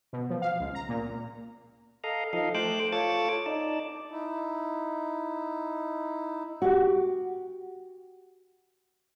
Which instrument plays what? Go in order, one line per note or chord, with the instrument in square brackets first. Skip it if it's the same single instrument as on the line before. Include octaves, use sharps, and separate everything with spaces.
[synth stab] B2
F3
F5
C#2
A#5
A#2
[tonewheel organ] A4 D#5 F5 A#5
F3 D#4 A4 D#5 F5
A3 C5 G5 A5 D6 F#6
F4 A4 C#5 A5 D6 A6
D#4 D5 A5
[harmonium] D#4 E4
[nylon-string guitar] F#4 G4